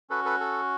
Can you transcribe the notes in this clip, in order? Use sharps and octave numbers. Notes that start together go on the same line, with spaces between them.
C#4 F#4 A4 B4
A4 B4
A4